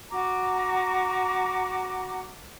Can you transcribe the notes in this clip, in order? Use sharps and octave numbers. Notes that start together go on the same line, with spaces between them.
F#4 A#5 D6